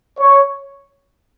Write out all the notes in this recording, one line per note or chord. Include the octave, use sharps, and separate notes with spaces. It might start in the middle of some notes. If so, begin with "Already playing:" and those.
C#5